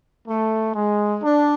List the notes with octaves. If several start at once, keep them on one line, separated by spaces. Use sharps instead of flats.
A3
G#3
D4